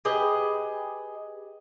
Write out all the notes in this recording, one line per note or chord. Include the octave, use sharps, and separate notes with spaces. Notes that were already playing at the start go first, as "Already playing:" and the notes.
G4 G#4 B4 D#5